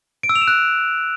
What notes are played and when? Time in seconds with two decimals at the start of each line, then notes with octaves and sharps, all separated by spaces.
0.23 D7
0.29 E6
0.35 F7
0.41 E7
0.48 F#6